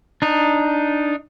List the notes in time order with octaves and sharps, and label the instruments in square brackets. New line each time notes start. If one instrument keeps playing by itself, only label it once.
[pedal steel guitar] D4 D#4